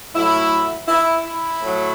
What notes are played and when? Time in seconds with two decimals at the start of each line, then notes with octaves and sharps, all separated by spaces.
0.15 A2 F#3 E4
0.88 E4
1.25 E4
1.62 A2 F#3